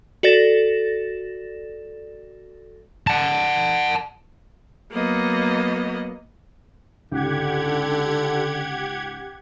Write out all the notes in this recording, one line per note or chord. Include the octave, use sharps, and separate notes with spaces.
F#4 A4 D5 A6 A#6 E7
F#5 A5
F#3 A#3 B3 D#5
C#2 G#2 D3 G4 F#5 G#6